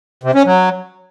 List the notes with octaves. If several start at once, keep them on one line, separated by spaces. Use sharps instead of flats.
C3
C#4
F#3